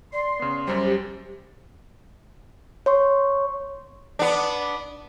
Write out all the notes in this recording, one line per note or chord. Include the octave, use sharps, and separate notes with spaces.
D5 C6
C#3 B3
F#2 G3 C5
G4
C#5 C6 C#6
B3 D4